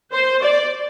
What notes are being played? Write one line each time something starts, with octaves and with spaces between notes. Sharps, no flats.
C5
D5